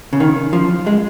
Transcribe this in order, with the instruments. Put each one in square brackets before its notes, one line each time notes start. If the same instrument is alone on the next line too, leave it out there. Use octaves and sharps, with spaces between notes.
[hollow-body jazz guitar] C#3
D#3
F3
G#3